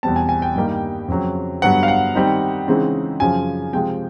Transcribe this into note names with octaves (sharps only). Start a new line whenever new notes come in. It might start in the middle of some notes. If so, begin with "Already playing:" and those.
E2 B2 G3 C4 A5
G#5
G#5
G5
G2 D#3 G3 A#3 D#4
F2 C#3 F#3
G2 D3 F#3 B3 F#5
F5
F#5
D#3 G3 C4 D#4
C#3 E3 G#3 C4 D#4
F#2 C#3 F3 G#5
C3 F3 G#3 G5